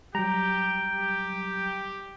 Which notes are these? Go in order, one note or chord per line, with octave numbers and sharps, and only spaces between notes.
F#3 G3 G4 G5 A#5
G4